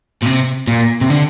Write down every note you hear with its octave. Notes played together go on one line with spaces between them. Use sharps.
A#2
C3
A#2
C3
D3